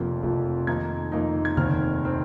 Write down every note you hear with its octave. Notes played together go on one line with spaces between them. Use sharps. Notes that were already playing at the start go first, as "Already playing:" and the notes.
Already playing: F1 F2 F3 A#3
F1 F2 F3 A#3
F2 D#3 A#3 D#4 G#6
F2 D#3 A#3 D#4
G#6
F1 D#2 D#3 C4 F6
D#3 C4